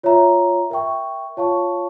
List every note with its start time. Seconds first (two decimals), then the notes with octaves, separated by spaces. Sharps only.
0.03 F4 C#5 E5 A#5
0.70 A#4 E5 G5 C#6
1.37 F4 C#5 F5 A5 C#6